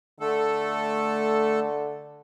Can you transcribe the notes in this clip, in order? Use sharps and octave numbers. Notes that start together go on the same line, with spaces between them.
D3 A3 A4